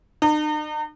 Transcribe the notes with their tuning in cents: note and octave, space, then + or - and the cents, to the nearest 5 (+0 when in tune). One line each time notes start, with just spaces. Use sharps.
D#4 -45